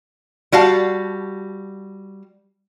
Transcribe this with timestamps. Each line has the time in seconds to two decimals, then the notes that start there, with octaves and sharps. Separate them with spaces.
0.52 G3 F#4 F5 A5